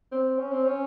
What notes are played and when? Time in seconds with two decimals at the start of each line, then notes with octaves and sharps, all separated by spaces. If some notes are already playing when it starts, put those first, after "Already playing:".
0.12 C4
0.38 C#4
0.52 C4
0.66 C#4